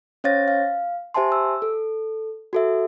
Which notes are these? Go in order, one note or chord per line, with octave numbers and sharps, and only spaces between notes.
C#4 C5 C#5 F5 A6 A#6
F5
G4 C5 E5 G#5 A5 C6
E6
A4
F#4 A4 E5